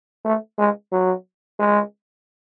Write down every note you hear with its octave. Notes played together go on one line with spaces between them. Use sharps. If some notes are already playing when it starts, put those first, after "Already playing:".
A3
G#3
F#3
G#3